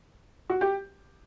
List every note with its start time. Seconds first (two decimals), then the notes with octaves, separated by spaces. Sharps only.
0.50 F#4
0.61 G4